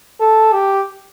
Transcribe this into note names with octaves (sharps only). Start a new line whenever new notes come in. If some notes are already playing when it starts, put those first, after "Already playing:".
A4
G4